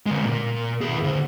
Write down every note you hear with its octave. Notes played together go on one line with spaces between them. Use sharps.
D3 G#3
A#2
D#2 G#4
D3 A#3